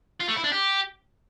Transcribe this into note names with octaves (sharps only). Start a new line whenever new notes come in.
F4
A3
E4
D4
G4